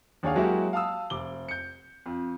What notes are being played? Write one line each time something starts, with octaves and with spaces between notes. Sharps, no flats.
D#2 D4 G#4 C#5 F5 F#5
F#3 G#3 A#3 E4 F#4 G4
F5 A5 D#6 E6
F1 D6 G7
G6 C#7
F2